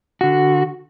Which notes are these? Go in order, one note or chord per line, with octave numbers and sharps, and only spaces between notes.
D3 F#4